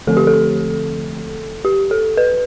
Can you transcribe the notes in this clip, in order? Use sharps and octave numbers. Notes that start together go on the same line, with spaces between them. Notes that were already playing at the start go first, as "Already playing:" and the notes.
D3 F3 A3 C4 A4
G4
A4
G4
A4
B4